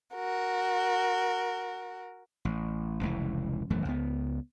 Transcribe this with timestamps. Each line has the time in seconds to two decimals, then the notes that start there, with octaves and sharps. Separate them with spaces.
0.14 F#4 A#4
2.45 A1
3.01 F1 C#2 E3
3.70 D#1 F#2 E3 A3
3.85 C#2 B3